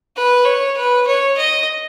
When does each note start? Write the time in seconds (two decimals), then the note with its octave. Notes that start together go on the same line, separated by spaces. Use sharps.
0.16 B4
0.46 C#5
0.77 B4
1.07 C#5
1.37 D#5